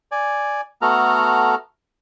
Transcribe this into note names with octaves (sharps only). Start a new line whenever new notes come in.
D5 G#5
A3 B3 F#4 A4 A#5 F6